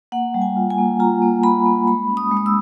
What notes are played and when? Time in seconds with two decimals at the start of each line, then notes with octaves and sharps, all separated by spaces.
0.12 A#3 F#5
0.34 G3
0.42 G#5
0.56 F4
0.70 G#5
0.78 A#3
1.00 F4 A#5
1.22 A#3
1.43 A#3 B5
1.66 A#3
1.87 G#3 B5
2.09 C#4
2.17 D#6
2.31 G#3
2.37 D#6
2.46 E6